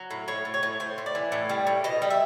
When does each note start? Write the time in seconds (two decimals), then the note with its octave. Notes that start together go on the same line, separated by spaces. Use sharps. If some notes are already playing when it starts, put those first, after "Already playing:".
Already playing: F#3
0.11 A2
0.28 A2 C#5
0.45 A2
0.54 C#5
0.63 A2
0.80 A2 C5
0.98 A2
1.06 D5
1.15 E3
1.32 A2
1.49 G3
1.67 A2
1.84 B2 D#5
2.02 G3
2.10 E5